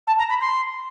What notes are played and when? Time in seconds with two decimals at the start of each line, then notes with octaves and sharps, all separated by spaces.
0.07 A5
0.18 A#5
0.29 B5
0.41 C6